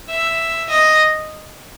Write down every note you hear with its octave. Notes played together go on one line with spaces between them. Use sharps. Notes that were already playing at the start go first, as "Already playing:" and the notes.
E5
D#5